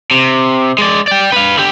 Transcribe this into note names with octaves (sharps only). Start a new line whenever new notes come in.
C3
G#3 D5
D5 G5
B4 F5
D3 G4